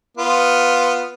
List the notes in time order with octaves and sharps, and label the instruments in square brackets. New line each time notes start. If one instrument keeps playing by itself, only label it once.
[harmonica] B3 F4